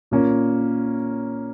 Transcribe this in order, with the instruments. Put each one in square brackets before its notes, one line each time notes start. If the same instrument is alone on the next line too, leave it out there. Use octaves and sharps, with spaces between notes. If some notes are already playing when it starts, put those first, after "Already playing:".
[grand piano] A#2 A#3 C#4